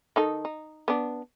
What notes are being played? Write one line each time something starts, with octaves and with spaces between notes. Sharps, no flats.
D#3 D#4 A4
D#4
B3 D4